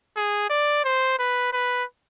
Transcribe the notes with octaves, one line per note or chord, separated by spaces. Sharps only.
G#4
D5
C5
B4
B4